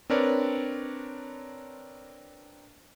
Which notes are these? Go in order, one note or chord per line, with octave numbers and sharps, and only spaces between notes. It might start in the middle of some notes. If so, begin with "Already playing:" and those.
C4 D4 A#4 B4 C#5 D5